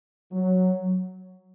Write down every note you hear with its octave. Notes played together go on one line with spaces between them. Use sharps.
F#3